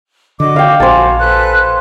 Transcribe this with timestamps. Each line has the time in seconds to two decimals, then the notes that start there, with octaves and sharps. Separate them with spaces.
0.40 D3 F#4 D#5 D6
0.56 F5 G5
0.80 A#1 F#4 C5 G#5 A5
1.19 A4 B4 F#6